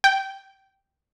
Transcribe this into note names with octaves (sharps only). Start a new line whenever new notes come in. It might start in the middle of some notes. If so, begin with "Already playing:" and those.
G5